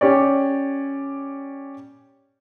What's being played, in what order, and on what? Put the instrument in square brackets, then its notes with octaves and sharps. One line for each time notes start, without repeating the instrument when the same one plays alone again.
[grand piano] C#4 G4 C#5 D5